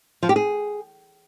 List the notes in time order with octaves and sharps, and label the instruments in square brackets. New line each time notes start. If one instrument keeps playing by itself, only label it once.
[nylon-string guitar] F3
G4
G#4